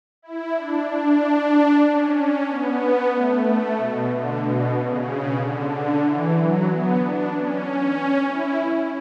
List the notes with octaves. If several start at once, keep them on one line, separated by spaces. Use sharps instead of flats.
E4
D4
D4
C#4
C#4
B3
A3
A3
B2
D3
B2
C#3
D3
D3
E3
F#3
B3
D4
C#4
E4